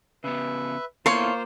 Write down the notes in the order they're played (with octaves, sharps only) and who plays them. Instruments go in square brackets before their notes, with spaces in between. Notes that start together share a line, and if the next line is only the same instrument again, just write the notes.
[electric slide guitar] C#3 B3 [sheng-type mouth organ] B4 E5
[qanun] A#3 [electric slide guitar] B3 E4 A4 [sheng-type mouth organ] F4 C5 [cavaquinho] C#5 C6